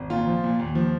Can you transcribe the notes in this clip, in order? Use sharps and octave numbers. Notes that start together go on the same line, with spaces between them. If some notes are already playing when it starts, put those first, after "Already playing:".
Already playing: G#1
A#2 F4
F3
A#2
D#2
F3